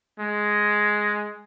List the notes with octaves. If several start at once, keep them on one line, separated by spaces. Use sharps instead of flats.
G#3